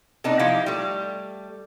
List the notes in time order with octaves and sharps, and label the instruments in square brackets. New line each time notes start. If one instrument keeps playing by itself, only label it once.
[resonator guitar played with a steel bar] C3 B3 D4 D#4
F3 D#4 E4 G4 F5
G3 A3